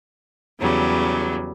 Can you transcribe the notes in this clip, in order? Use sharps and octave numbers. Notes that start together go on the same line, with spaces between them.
E2 C#3 F#3 G3